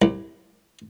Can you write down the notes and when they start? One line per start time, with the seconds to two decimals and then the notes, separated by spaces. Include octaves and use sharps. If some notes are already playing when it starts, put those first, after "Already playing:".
0.02 C2